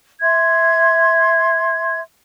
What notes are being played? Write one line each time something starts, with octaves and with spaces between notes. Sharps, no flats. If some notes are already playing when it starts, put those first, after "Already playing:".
E5 C6 G#6